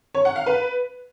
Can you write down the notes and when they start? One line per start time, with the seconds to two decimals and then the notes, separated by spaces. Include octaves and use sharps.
0.15 C#5
0.25 F#5
0.36 F5
0.46 B4